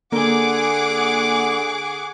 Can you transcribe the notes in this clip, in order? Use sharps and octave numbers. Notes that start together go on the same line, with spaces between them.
D3 A#3 G#4 F#5 D6